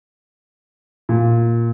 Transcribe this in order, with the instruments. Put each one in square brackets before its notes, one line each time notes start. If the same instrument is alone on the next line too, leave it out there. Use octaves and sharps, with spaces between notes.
[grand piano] A#2